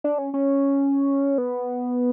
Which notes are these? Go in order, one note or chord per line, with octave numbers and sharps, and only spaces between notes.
D4
C#4
C#4
B3